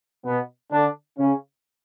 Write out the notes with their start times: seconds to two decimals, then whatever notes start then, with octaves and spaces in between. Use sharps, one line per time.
0.26 B2 B3
0.72 D3 D4
1.19 C#3 C#4